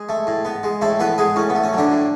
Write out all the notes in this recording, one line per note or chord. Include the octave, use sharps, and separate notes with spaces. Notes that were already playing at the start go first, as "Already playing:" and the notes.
Already playing: G#3 G#4
A3
A2
B3
G#3
A2 A3 A4
A2 B3 B4
G#3 B3 G#4
A2 C#4
B3
A3
C#4
D3 F#3 D4
A2